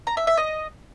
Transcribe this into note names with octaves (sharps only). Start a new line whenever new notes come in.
A#5
E5
E5
D#5